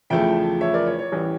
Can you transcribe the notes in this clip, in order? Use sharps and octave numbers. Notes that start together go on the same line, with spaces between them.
E2 C#3 F3 A3 E5 G5
C#5 E5
A#4 D5
C#5
C#5
A1 E3 G3